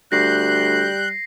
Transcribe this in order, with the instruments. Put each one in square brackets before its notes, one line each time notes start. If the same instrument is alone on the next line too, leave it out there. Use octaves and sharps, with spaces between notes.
[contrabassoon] D2 [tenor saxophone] G3 [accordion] F#6 G6 [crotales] A#6 C7